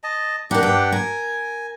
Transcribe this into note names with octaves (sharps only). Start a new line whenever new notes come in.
D#5 A5
D4 D#4 G4 A#4 F#5
G2 G5
A#4 G#5